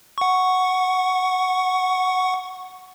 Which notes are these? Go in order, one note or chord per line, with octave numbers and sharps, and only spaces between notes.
F#5 C#6